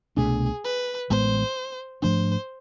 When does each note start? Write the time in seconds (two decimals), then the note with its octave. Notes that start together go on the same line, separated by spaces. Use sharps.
0.17 C2 B2 A3 D4 G#4
0.64 B4
1.10 A1 A2 G#3 B3 C5
2.02 G#2 F3 A3 D4 C5